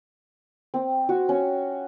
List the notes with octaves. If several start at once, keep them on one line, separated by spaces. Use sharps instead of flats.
C4
F#4
C#4